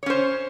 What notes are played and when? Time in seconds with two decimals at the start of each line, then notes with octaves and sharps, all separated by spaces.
0.03 C#5
0.06 C#4
0.10 C5